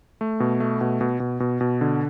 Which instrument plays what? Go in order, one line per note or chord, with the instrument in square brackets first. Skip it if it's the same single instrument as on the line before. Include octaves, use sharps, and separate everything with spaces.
[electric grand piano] A3
B2
A3
B2
B2
B2
B2
B2
D3